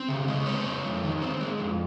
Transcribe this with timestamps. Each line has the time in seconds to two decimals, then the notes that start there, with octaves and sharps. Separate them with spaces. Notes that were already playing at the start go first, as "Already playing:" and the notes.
Already playing: C4
0.08 C#3
0.28 G#3
0.46 C4 C#5
0.65 G#3
0.84 F2
1.04 D#3
1.22 C4
1.41 G#3
1.59 F2